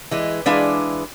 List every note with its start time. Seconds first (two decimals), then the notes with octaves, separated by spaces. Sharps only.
0.11 E3 G#3
0.46 E3 G#3 D4 G#4 B4 F5